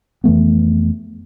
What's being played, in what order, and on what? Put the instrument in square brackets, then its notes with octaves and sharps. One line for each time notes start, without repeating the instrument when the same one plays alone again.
[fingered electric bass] F2 E3 A3 B3